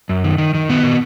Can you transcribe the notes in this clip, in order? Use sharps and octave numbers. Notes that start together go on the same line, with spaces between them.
F#2
D#3
D#3
D#3
A#2 B3
A#2